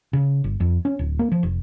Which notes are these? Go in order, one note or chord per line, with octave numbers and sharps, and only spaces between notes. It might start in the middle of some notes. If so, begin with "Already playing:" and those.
C#3
G1
F2
C#4
D1
A#3
F3
F1